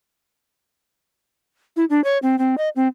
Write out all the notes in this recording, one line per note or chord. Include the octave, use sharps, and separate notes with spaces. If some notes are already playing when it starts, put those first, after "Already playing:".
E4
D4
C#5
C4
C4
D#5
C4